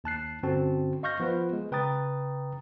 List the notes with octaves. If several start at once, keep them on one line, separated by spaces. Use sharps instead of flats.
D#2 A5 F#6 C7
G2 D3 C4 C#4 F#4 A5
D#5 F5 C#6 F6 G6 A#6
F3 B3 F4 B4
G#3
C#3 B4 G5 A#5 D#6 A6